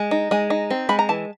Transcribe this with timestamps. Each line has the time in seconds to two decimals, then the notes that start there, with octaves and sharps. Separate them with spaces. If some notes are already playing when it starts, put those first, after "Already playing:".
Already playing: G#3
0.11 D#4
0.31 G#3 G#5
0.50 D#4
0.70 C4
0.89 G#3 B5
0.99 A#5
1.09 E3 A5